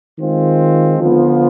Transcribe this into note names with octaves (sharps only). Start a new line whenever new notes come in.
D#3 G#3 C4 F4
D3 F3 B3 F4